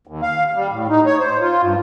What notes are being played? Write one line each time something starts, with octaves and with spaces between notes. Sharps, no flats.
D#2
F5
G3
A2
D#4
C#5
C5
F4
G2